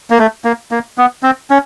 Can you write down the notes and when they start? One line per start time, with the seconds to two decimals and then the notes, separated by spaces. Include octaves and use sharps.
0.10 A#3
0.19 A3
0.45 A#3
0.71 A#3
0.98 B3
1.23 C4
1.50 C#4